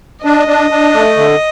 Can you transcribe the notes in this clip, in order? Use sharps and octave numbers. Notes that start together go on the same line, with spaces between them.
D4 D#5
D4
D4
A3
D3